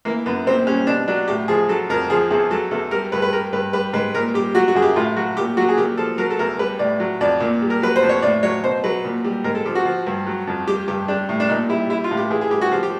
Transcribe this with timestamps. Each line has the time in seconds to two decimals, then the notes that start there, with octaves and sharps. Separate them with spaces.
0.05 E3 A#3
0.26 F#2 B3
0.46 A#2 C4
0.67 G3 C#4
0.87 B2 D4
1.08 F#3 D4
1.28 A2 G4
1.48 F3 G#4
1.69 F#3 A4
1.90 F2 A#4
2.10 F3 G#4
2.31 E2 G#4
2.51 F#3 A4
2.71 E2 A4
2.91 G3 A#4
3.12 G2 B4
3.22 B4
3.33 G3 A#4
3.53 G2 B4
3.73 G3 B4
3.93 G#2 B4
4.14 A#2 A#4
4.34 G3 G4
4.55 F#3 F#4
4.68 F#4
4.75 F#2 G#4
4.82 G4
4.96 A2 F4
5.16 F#3 F#4
5.37 A#2 G4
5.57 F#3 F#4
5.69 G#4
5.78 A#2 G4
5.98 F3 A4
6.18 F#3 A#4
6.30 A4
6.39 E2 A#4
6.59 G3 B4
6.79 A2 D5
7.00 F#3
7.21 F2 D5
7.40 A#2
7.62 G3
7.70 A#4
7.82 F#3 B4
7.96 C5
8.03 F2
8.09 C#5
8.22 A2 D5
8.43 F#3 C#5
8.63 B2 C5
8.84 F#3 B4
9.05 A#2
9.24 G3
9.44 G#2 A#4
9.55 A4
9.65 F3 G4
9.75 F#4
9.85 F3
10.07 G2
10.26 F#3
10.47 F2
10.67 G3 G4
10.88 G2 G4
11.08 G3 D4
11.29 A2
11.40 D4
11.49 A#2 D#4
11.69 G3 E4
11.90 G3 E4
12.04 F4
12.11 A2
12.17 G4
12.30 E3 G#4
12.41 G#4
12.51 G3 G4
12.61 F#4
12.72 F3 G4
12.83 G4